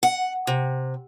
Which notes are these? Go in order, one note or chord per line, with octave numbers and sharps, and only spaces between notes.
F#5
C3